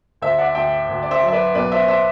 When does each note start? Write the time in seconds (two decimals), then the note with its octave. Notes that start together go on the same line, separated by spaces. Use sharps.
0.22 D2 C5 E5
0.38 D5 F#5
0.55 D2 E5 G5
0.89 D2
1.03 D5
1.11 C5 E5
1.23 F#3
1.28 E5
1.33 B4 D5
1.55 B1 B4 D5
1.72 C5 E5
1.88 C5 E5